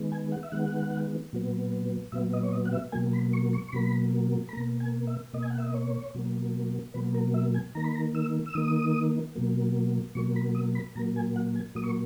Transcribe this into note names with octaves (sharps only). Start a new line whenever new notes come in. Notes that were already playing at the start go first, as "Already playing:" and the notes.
Already playing: D#3 G#3 B3
G#5
F#5
E5
D#3 G#3 B3 F#5
A#2 F#3 B3
A#2 F#3 B3 E5
D#5
C#5
D#5
F#5
E5
B2 F#3 A#3 G#5
B5
C#6
C#6
C#6
B2 F#3 A#3 B5
B5
B2 A#3 A#5
G#5
E5
B2 A#3 D#5
G#5
F#5
E5
D#5
C#5
B2 F#3 A#3
B2 F#3 A#3 B4
A#4
E5
G#5
D#3 A#3 A#5
B5
A#5
E6
E6
D#3 A#3 D#6
B2 F#3 A#3
B2 F#3 A#3 C#6
B5
D#6
B5
A#2 F#3 A#3 A#5
G#5
F#5
G#5
A#2 F#3 A#3 D#6
C#6